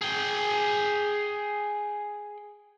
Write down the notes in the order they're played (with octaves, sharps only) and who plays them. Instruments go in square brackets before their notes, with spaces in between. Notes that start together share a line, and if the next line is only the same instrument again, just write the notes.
[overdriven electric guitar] G#4 G5